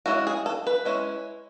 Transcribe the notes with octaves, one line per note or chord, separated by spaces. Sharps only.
G#3 C#4 E4 F#4
G#4
A4
B4
G#3 C#4 E4